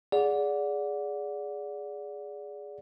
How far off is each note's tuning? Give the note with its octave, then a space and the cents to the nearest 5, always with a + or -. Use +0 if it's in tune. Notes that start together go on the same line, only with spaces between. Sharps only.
G#4 +0 D5 -20 F#5 -25